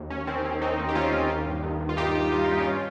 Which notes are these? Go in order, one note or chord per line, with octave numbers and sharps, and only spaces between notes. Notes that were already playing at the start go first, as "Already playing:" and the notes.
Already playing: D#2
D#2 C#4
D#3 C4
D#3 C#4
D#3 C4 D#4
D#2
G4
D#2 C#4 F4
D#2
D#3
G2
D#3
D#3
F4
G2 D#4 G4
G2
G2 F4
G2 D#4
C#4 F4